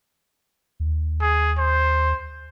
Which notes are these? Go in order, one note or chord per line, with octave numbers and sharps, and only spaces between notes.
D#2
G#4
C5